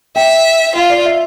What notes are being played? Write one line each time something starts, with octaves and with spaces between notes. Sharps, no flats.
E5 G5
F4 F5
D5
E5